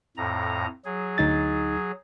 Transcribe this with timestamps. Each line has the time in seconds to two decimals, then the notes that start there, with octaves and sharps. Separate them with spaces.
0.17 F2 A2 A#5
0.85 F#3 G#4
1.18 D2 D#4 A6